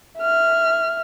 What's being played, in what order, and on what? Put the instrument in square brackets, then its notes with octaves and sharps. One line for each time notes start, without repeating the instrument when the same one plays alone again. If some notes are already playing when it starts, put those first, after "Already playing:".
[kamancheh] E5 F6